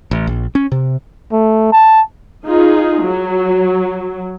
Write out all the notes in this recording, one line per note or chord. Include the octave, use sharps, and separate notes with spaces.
A1
A#1
C#4
C3
A3
A5
D#4 F4 G#4
F#3